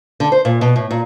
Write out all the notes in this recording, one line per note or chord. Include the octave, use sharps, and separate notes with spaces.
D3
C5
A#2
B2
A2
A#2